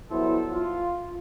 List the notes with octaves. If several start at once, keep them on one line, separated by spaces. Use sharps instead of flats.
F#3 G3 B3 E4 A4 C5
F4